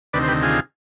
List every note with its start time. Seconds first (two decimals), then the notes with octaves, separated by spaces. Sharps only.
0.13 D2 C3 D#3 B4 D5
0.23 C5
0.28 G4 B4
0.43 F4 G#4